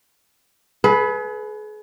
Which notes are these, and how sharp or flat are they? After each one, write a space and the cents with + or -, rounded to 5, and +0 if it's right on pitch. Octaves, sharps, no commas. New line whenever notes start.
G#4 +40 B4 +0